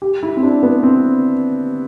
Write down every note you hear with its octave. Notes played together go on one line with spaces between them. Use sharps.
G4
E4
C4
D4
B3
C4